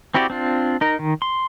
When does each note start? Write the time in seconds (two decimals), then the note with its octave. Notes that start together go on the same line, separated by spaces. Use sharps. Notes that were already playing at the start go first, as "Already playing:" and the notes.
0.14 C4 E4 F#4 G4 D5
0.30 C4 D4 F4
0.81 D#4 A#4
0.99 D#3
1.22 C6